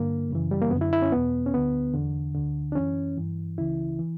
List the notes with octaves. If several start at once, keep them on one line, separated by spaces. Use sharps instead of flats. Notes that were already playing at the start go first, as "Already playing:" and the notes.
Already playing: G2 D3 A#3
F#2 C#3 E3
G3
A#3
F#2 D3 B3
E4
E4
C#4
E2 B2 B3
C#4
D2 D3 B3
E2 D3
D2 D3
D4
F#2 E3 C#4
G2 E3
C#2 C#3 E3 E4
E3